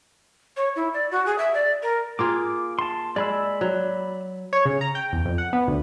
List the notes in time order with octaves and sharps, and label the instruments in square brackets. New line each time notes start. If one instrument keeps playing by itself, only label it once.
[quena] C#5
E4
D5
F#4
G#4
E5
D5
A#4
[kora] A#3 F4 G#4 [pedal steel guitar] D6
[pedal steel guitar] A5 C6
[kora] G#3 [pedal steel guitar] D5 B5 E6
[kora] F#3
[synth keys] C#5
C#3
A#5
G5
E2
F2
F#5
B3
D2